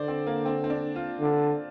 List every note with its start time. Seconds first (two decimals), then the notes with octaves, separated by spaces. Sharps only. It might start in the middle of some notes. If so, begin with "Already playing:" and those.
Already playing: D3 C5 D5
0.08 C4
0.27 A#3
0.45 C4
0.64 C4
0.70 D4
0.96 F4
1.20 D3